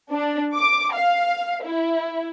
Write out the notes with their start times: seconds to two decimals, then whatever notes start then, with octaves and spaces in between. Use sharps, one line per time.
0.11 D4
0.56 D6
0.93 F5
1.64 E4